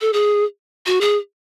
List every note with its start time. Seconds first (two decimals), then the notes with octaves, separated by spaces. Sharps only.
0.01 A4
0.13 G#4
0.86 F#4
1.01 G#4